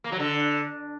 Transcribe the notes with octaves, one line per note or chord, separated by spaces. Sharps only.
A#3
F#3
D3